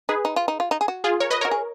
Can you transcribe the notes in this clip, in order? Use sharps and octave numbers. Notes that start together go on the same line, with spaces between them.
D#4 G#4 B4
D#4
F4
D#4
F4
D#4
G#4
F#4
F4 G#4
A#4 C#5
B4 D#5
F#4 A#4 C#5
G#4